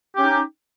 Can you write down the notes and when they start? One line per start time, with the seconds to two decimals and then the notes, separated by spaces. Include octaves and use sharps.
0.15 G4
0.18 C#4
0.20 D#4